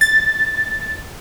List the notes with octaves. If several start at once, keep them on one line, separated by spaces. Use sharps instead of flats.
A6